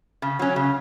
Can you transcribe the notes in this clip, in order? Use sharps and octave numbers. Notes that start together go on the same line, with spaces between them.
C#3
F#3 C#4
C#3